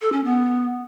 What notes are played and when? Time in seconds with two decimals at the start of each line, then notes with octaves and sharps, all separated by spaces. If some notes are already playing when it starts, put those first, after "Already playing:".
0.01 A4
0.12 C#4
0.24 B3